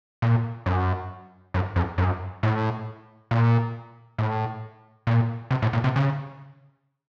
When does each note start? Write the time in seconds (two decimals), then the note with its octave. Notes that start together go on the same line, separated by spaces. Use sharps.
0.22 A#2
0.66 F#2
1.54 F#2
1.76 F2
1.98 F#2
2.43 A2
3.31 A#2
4.19 A2
5.07 A#2
5.51 C3
5.62 A2
5.73 A#2
5.84 C3
5.96 C#3